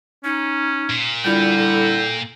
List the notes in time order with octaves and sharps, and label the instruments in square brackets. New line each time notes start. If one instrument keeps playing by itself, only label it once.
[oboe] C#4 [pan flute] D#4
[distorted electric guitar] A#2
[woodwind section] D3 G3 E4 [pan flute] F4 [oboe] G5
[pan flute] A4